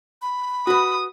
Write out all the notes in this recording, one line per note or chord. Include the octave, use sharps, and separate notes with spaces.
B5
F#4 B4 D#6